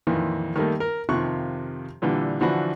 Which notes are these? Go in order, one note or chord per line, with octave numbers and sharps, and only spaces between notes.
F2 A#2 D#3 E3
D#3 G3 A3 A#3
A#4
F2 C3 D#3 F3 C#6 F#6
A#2 D3 E3 G3
D3 E3 F3 D4 F#4 B5